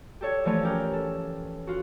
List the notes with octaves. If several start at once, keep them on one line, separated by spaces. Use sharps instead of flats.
G4 A4 C#5
E3 F3 A3 C#5
C#4 G4 A#4
A4
F4 F#4